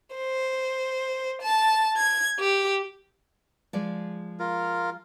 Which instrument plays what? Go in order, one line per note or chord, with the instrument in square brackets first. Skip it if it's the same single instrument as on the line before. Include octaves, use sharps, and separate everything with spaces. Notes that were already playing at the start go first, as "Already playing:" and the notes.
[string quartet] C5
A5
G#6
G4
[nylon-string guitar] F3 G#3 D5
[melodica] F4 A#4